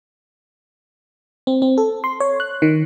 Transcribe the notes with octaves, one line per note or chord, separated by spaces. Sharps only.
C4
C4
A4
C6
C#5
F#6
D#3